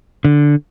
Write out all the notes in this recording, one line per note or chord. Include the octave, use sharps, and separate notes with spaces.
D3